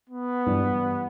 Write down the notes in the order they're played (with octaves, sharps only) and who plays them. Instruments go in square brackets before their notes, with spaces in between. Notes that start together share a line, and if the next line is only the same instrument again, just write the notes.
[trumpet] B3
[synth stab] G2 E3 G3